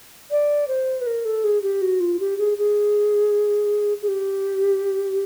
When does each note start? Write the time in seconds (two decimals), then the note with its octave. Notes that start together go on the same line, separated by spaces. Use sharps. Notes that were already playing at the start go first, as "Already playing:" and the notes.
0.31 D5
0.68 C5
1.01 B4
1.07 A#4
1.25 A4
1.44 G#4
1.62 G4
1.82 F#4
2.00 F4
2.20 G4
2.38 G#4
2.58 G#4
4.02 G#4
4.08 G4